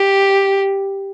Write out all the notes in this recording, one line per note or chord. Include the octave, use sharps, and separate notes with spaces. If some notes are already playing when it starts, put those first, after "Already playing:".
Already playing: G4